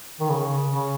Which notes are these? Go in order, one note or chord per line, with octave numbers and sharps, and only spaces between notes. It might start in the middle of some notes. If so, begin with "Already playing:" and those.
D#3
C#3
C#3